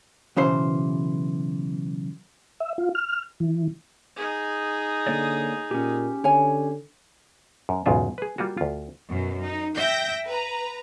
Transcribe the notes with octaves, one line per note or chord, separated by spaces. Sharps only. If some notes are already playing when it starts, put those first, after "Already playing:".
B1 C#3 E3 C5
E5
F4
F6
E3
D#4 G#4
D3 A#3 C#5 D5
A#2 C#4 G4
D3 C#5 G#5
F#2
B1 E2 G#2 C#3 F4 E5
G#4 B4
G3 A#3 F4 F#4
D2 F4
F#2 B2
D#4
E5 G5 G6 A#6
B4 A#5